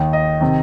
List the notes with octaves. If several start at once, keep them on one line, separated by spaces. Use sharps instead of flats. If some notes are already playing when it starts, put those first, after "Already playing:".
Already playing: D#2 D#3
D#5
C3 D#3